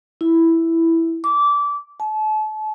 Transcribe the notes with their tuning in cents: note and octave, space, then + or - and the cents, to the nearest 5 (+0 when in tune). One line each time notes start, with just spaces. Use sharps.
E4 +0
D6 -20
A5 -35